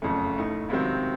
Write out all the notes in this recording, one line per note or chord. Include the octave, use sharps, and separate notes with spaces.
F#1 F2 C#3 A3
A2 A3 D#4
C#2 C3 D#3 F#3 C4